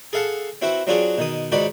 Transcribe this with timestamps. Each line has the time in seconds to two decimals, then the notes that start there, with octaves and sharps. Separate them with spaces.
0.13 G#4 A4 F5 F#5 A5
0.62 C4 E4 F#4 B4
0.87 F#3 C4 D4 F4 F#4 G#4
1.18 B2 D#3 D#6
1.52 C#2 G#2 D#3 F#4 D5 B5